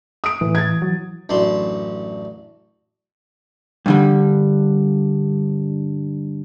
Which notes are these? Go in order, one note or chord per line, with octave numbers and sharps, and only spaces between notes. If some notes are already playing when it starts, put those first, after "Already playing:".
D#6 D7
A2 E3
G#6 A6
F#3
A1 F#2 D4 C6
G2 D3 G3